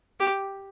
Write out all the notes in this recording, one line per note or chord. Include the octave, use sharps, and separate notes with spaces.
G4